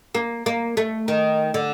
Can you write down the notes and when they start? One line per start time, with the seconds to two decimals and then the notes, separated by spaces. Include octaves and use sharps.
0.15 A#3
0.46 A#3
0.77 A3
1.08 D#3
1.54 D3